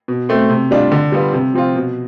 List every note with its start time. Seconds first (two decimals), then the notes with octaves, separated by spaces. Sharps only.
0.08 B2
0.29 A3 C4
0.50 C3
0.71 G3 D4 F4
0.92 D3
1.12 G3 B3 F4
1.33 C3
1.54 F3 C4 F4
1.76 B2